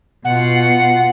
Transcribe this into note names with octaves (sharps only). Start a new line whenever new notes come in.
B2 F4 F#5